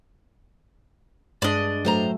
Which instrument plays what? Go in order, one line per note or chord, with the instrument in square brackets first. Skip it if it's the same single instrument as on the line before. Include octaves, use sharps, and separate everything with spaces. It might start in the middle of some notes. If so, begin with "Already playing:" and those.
[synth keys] G2 D4 [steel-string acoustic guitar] G#3 [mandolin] D5 D#5
[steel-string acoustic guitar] A2 C5 A#5 [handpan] F#3 A3